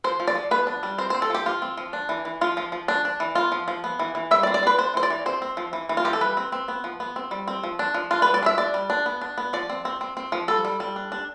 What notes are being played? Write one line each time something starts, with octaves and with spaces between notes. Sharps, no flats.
F3 C5
F3
D5
F3
B3 B4
D4
G3
C4 C5
C4 C5
A4
F3 G4
F3 F4
C4
F3
D4
E3
E3
F3 F4
F3
F3
D4
D4
E3
B3 F4
F3
F3
B3
E3
E3
G3 E5
D5
C4
D5
C4 B4
D4 C5
E3 C5
D5
E3
C4 C5
C4
F3
E3
E3
F4
E3 G4
A4
G3 B4
C4
C4
B3
F3
B3
C4
G3
C4
F3
D4
F3
D4 F4
G3 B4
D5
D4
E5
D4 D5
G3
D4
B3
D4
B3
F3 D5
C4
C4
C4
C4
F3
G3 A4
G3
G3
D4
D4